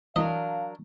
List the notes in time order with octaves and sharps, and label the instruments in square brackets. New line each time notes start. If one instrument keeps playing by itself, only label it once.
[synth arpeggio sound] E3 [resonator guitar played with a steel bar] F#3 D4 A#4 [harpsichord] D#5 [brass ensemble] F5